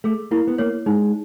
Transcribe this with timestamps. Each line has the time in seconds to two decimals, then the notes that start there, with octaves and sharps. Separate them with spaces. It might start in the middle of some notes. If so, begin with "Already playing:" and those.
0.04 A3 G#4
0.31 A#3 E4
0.47 B3
0.58 A#3 C#5
0.86 G#3 D#4